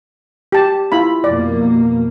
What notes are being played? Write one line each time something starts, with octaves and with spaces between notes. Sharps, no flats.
G4 A5
E4 F4 B5
F2 B2 A#3 D5